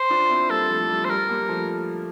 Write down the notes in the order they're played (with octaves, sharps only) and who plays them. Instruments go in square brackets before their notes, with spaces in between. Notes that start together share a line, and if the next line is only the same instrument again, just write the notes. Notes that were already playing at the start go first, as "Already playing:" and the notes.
Already playing: [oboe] C5
[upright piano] D4 F4
C4 E4
[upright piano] G3 A#3 [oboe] A4
[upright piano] F3 A3
G3
[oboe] C5
[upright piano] G3 [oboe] A#4
[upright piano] G3 A#3
F3 A3